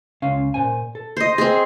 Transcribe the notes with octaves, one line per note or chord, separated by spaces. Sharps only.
C#2 C#4 F5
A#2 C5 G#5
A4
C5 D#5
C4 G#4